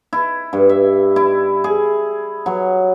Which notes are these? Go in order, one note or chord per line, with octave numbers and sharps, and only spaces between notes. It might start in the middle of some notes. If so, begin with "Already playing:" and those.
E4
G2
E5
E4
G#4
F#3